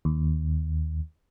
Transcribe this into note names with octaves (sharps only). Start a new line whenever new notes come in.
D#2